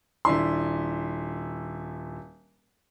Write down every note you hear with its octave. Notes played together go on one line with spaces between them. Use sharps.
D#1 D4 E4 C6